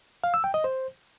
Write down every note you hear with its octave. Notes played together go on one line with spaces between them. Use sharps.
F5
E6
G5
D#5
C5